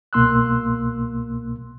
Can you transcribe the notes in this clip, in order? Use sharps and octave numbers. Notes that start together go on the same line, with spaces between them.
C2 B2 A#3 C6 E6 F#6